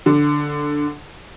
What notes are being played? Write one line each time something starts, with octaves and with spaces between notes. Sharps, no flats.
D3